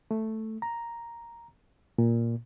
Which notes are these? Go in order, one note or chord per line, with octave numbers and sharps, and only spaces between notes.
A3
A#5
A#2